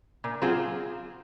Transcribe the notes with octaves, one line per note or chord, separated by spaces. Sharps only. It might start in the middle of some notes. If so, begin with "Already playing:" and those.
A#2
F#3 C4 F4 G#4